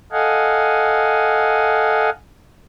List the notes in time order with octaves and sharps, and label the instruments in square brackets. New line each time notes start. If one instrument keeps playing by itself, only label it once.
[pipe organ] A4 D#5 F5 F#5 G#5